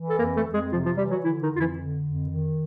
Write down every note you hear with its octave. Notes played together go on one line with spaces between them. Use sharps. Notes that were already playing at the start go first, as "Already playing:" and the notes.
Already playing: E3
A4
F2 A#3 A#4
A3 A4
F2
G#3 G#4
C3 F3 F4
F3 F4
E3 G3 G4
F#3 F#4
D3 E3 E4
D#3 D#4
F2 F4
E3 E4
D3
F2
D#3